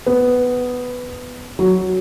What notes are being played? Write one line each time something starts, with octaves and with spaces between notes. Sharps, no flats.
B3
F#3